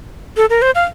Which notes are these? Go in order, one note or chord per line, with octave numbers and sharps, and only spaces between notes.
A4
A#4
C5
F5